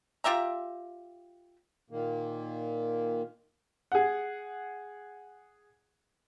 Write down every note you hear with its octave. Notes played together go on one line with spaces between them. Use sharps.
F4 G4 E5 A#5
A#2 D#3 A#3
G#4 F#5